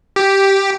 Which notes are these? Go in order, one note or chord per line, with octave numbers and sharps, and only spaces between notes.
G4